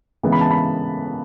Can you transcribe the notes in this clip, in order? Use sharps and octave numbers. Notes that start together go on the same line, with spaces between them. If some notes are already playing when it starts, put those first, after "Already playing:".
C#3 E3 G#3 B3
B5
A5
B5